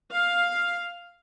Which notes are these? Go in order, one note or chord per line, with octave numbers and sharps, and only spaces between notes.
F5